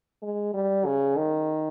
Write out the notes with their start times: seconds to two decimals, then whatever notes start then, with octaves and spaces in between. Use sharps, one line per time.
0.22 G#3
0.54 G3
0.86 C#3
1.17 D#3